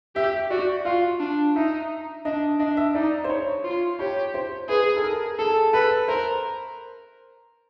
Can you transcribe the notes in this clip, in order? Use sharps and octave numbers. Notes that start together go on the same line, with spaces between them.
G4 E5
F#4 D5
F4 F5
D4
D#4 E5
D4 D#5
D4 D#5
E5
D#4 D5
C5
C#5
F4
G4 C#5
C5
G#4 B4
A4
A#4
G#4 A4
A4 B4
A#4 C5